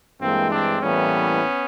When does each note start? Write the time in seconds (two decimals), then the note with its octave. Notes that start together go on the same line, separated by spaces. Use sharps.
0.20 G2 E3 G#3 A#3 C4
0.51 C4 D4
0.82 A2 E3 G3 A#3 B3 C#4